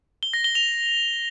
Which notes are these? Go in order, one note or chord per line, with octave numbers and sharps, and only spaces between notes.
G7
A#6
G7
F7